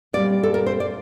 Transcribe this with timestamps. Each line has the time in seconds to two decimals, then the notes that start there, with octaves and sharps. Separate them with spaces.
0.13 A#2 G3 C4 D5
0.43 A4
0.54 A#4
0.66 C5
0.80 D5